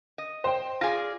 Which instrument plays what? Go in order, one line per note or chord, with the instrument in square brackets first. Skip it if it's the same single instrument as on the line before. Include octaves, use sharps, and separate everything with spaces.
[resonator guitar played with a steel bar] D#5
[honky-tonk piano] C5 G5
[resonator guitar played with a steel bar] F4 G#4 D5 [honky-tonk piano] A#6